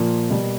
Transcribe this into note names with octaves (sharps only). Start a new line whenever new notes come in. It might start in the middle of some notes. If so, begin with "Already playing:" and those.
Already playing: A#2 F3 A#3
B2 G3 A#3